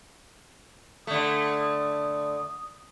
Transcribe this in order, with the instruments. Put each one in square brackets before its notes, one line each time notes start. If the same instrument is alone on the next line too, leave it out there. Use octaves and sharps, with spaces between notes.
[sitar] D3 A3 [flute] D#6